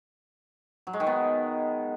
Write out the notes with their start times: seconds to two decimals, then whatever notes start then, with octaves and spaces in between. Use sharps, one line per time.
0.87 F#3
0.93 G#3
1.00 D#3
1.07 B3